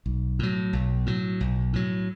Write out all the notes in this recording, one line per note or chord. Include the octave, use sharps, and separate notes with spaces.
B1
A2 F#3
B1
A2 F#3
B1
A2 F#3